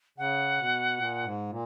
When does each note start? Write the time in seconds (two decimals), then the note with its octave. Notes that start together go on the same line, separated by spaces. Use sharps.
0.18 C#3 F#5
0.57 B2
0.97 A#2
1.23 G#2
1.49 A#2